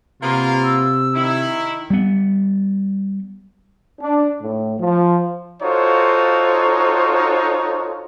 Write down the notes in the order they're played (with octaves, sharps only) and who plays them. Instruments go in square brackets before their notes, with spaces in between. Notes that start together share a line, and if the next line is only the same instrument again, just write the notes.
[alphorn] C3 [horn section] A#3 B3 F4
[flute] E6
[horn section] D#3 E4
[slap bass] G3 B3
[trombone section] D4
A2
F3
[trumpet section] D#4 F4 F#4 A4 C5 C#5